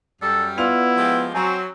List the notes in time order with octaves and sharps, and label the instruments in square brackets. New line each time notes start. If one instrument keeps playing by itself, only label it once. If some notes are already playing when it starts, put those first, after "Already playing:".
[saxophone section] F#2 G3 [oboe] A4
[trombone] B3 [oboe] E4 [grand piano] F4 D5 F7
[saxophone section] F3 G#3 G4
[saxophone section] F#3 [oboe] C4 [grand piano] G#5 A#5 C#6